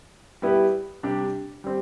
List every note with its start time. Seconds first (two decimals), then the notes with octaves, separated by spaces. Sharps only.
0.42 G3 B3 E4 G4
1.03 C3 G3 D4 G4
1.64 G3 C4